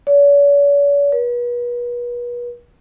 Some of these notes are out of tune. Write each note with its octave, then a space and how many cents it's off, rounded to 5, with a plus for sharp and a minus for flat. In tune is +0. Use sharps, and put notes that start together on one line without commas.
C#5 +45
B4 -35